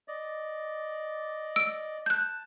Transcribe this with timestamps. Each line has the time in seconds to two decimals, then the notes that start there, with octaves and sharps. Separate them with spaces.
0.08 D5 D#5
1.56 E6 D7
2.06 A5 F#6 G6